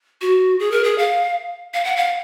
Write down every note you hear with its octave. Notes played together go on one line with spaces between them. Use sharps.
F#4
G#4
A#4
G#4
F5
F5
F#5
F5